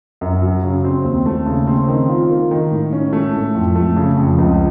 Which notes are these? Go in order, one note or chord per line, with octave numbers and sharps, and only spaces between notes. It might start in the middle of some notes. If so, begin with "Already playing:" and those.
F#2
F#3
C#3
C4
D#2
A3
C#3
C4
D#3
F4
A#3
D#3
A2
C#4
A3
A2
F2
A3
C#3
F2
C#2